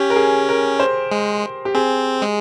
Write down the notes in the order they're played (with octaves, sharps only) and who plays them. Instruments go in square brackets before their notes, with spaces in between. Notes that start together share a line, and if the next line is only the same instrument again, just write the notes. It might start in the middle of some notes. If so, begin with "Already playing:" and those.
Already playing: [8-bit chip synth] C#4 [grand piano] G4
[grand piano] A#4
G#4
A#4
C5
[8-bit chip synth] G#3
[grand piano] G4
[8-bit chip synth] C4 [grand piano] G#4
[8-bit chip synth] G#3